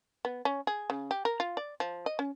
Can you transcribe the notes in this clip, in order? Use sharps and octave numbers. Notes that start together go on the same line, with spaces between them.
B3
C#4
G#4
C#3
G4
A#4
F4
D5
F3
D#5
C#4